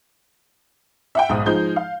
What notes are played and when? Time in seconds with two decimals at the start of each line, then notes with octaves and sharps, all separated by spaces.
1.15 E5 F#5 G5
1.29 B1 G#2 D#6
1.46 F3 G#3 D#4 G6
1.76 F5